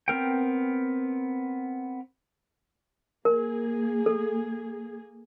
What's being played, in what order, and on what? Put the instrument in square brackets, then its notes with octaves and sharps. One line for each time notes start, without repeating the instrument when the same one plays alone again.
[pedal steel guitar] B3 C4 A#4 G5
[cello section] A#3 G#4 [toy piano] A#4
[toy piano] A4